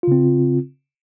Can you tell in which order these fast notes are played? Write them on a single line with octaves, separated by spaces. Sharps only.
F4 C#3 C4